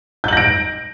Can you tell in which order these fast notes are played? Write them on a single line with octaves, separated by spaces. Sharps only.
G6 F#7 A#6 D7